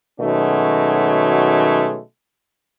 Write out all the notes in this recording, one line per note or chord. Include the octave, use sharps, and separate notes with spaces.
B2 D#3 F#3 G#3 A3 C#4